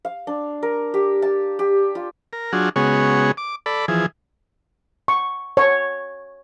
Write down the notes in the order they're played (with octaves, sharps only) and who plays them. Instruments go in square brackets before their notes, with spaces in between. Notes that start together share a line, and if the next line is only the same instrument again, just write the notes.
[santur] F5
D4
A#4
G4
A5
G4
F4
[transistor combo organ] A#4
F#3 D4 F4 F#4 G#4
C#3 G#3 B3 F#4 G#4 C#5
D6
A4 D5 B5
E3 F3 G#4
[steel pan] C#6
C#5